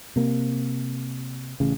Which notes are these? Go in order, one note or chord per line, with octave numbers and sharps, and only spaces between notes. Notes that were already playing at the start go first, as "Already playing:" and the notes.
C3 A#3
A1 C#3